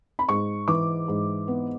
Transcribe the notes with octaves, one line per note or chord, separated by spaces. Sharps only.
B5
G#2 C#6
E3 D6
G#2
B3